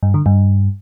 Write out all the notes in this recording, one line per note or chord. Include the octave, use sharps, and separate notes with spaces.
G2
D3
G2